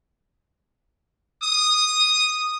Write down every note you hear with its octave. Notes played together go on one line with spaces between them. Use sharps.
D#6